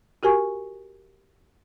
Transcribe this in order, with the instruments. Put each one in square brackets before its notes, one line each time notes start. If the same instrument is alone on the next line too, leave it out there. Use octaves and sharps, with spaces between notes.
[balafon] F#4 G4 A#4 G#5 C#6